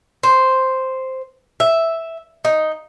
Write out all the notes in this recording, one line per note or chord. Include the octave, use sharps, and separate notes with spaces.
C5
E5
D#4